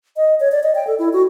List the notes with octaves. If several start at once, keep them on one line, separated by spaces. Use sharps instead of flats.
D#5
C#5
D5
D#5
G5
A4
E4
F#4